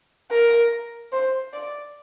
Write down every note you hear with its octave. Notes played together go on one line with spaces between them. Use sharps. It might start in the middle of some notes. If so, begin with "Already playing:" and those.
A#4
C5
D5